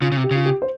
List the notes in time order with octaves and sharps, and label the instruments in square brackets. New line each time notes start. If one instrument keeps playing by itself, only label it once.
[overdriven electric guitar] C#3 [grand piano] F4
[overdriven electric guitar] C#3
C3
[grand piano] G4
[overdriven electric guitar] C#3 [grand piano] F4
[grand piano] G4
C5